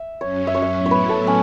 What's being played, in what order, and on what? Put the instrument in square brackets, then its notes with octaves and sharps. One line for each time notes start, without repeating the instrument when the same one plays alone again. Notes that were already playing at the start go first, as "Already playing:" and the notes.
Already playing: [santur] E5
[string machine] F#2 F#3 C#4 [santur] C#5
[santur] E5
C#5
E5
[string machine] A2 F#3 B3 E4
[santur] C#5
B4
A4
C#4